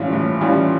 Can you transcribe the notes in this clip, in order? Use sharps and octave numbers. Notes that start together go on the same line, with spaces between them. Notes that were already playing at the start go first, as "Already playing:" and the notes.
Already playing: A2 E3 G3 C#4 F4
A2
E3 G3 C#4 F4